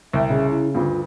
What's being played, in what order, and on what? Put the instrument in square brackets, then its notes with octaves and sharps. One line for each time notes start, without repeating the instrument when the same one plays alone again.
[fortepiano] C2 G5 [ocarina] E5
[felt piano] C#3
[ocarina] E4
[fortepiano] D2 G2 [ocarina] F4